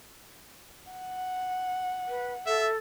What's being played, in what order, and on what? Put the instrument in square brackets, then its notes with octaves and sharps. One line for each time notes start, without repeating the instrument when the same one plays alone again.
[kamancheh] F#5
[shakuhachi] B4
[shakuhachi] A4 [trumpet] E5